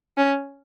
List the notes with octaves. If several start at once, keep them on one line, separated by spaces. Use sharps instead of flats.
C#4